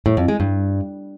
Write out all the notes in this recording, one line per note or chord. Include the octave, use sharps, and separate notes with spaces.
A2
F2
G#3
G2